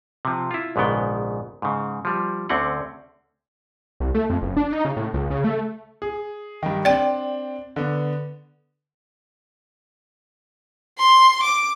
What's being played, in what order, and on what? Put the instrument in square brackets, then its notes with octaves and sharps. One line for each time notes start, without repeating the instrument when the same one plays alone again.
[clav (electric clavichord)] C3 F3
E4 F4
A#1 G#2 C#3 B3 G5
G#2 C#3
F3 G3
D2 D3 C4 C#4 F#5
[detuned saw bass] C2
A3
F2
F#1
D4
D#4
C#3
A2
C#2
C#3
A3
[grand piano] G#4
G2 D#3
[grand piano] C4 D4 [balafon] D5 G5
[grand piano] D3 B3
[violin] C6
D6